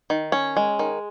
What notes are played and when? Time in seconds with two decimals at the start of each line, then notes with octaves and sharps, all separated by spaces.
0.10 D#3
0.32 C#4
0.57 G#3
0.79 D#3